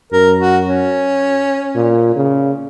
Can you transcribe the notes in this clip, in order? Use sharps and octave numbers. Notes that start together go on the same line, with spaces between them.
F#2 A#4
F#4
C#4
A#2
C#3